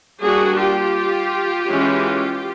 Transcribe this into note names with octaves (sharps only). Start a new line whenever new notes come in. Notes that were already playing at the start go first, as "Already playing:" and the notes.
G3 A#3 D4 F#4 G#4
F4 G4
E3 G#3 C#4